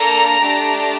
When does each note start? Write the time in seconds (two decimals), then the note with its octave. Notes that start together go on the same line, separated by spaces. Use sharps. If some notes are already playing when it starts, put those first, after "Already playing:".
Already playing: A#3 D4 A4 A#5
0.40 A3 D4 G4